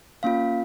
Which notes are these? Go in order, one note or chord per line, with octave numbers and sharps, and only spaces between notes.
A#3 C#4 F4 F5